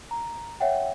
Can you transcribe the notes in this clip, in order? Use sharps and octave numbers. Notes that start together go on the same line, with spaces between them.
A#5
C#5 E5 F#5 G5